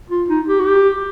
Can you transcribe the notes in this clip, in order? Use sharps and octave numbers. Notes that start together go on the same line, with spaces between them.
F4
D#4
G4
F#4
G4